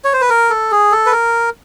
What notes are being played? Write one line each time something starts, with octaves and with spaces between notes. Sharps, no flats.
C#5
C5
B4
A#4
A4
G#4
A4
B4
A#4